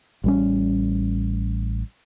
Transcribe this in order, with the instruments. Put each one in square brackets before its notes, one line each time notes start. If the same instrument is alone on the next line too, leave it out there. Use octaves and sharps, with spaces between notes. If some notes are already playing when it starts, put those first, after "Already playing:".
[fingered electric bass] A1 G3 C#4